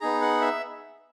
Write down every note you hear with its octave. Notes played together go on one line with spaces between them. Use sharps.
B3 D#4 G#4 A#5
F#5
E5